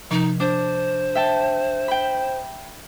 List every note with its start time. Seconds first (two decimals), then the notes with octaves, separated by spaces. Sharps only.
0.11 C3 F3 D#4
0.40 D4 C5
1.15 E5 G5 A5
1.88 G5 B5